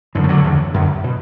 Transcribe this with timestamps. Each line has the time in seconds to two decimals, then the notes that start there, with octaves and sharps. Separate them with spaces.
0.15 F#2 D3 E3
0.24 A3
0.29 D3 F#3
0.44 E2 D3
0.74 F#2 D3
1.04 B2